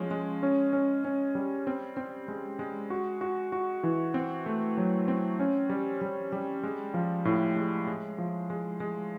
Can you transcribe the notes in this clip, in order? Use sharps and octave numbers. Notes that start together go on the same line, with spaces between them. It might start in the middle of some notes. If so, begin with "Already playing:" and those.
Already playing: F3 G#3 C#4
G#3
C#4
C#4
C#4
G3
C4
C4
G#3
G#3
F#4
F#4
F#4
E3
C4
A3
F#3
C4
C#4
G3
G3
G3
G#3
F3
A2
G#3
G#3
F3
G#3
G#3